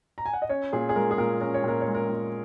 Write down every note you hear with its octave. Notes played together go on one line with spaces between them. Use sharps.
A#5
G#5
F#5
D#5
C#4 C#5
A#2 G#4
G#4
G#3 A#4
G#4
A#2 A#4
C#4 A#4
C#5
A#2 A#4
C#5
G#3
A#4
A#2